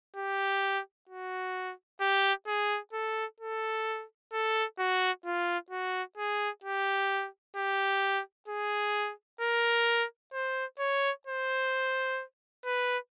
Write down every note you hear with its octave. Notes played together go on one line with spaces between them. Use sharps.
G4
F#4
G4
G#4
A4
A4
A4
F#4
F4
F#4
G#4
G4
G4
G#4
A#4
C5
C#5
C5
B4